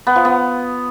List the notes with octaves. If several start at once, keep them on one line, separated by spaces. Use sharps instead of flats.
B3
F3
B3